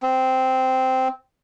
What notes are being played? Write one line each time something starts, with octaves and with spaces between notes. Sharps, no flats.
C4